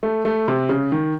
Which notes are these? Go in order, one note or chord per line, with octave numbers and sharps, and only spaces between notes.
A3
A3
C3
C#3
D#3